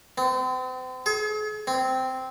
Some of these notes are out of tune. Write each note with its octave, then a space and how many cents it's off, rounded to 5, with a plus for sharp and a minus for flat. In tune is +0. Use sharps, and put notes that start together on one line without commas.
C4 -40
G#4 +45
C4 -10